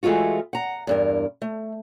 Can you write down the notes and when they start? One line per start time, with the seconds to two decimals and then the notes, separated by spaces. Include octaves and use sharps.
0.03 E3 G#3 A3 F4 F#4
0.53 F#5 A#5
0.87 E2 G2 A#4
1.42 A3